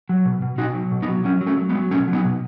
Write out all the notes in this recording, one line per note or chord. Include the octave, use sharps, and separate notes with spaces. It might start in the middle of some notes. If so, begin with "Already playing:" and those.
F#3
B2
B2
B2 D#4 F#4
F#3
B2
B3 D#4
F#3
F#3 C#4 E4
F#3
A3 C#4
F#3
G#3 B3
F#3
B2 A3 C#4
F#3
B3 D#4
B2